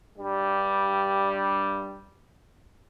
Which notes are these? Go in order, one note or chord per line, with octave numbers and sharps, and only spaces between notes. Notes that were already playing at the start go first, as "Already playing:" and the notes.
G2 G3